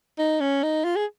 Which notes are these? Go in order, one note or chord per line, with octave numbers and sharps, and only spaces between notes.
D#4
C#4
D#4
F4
G#4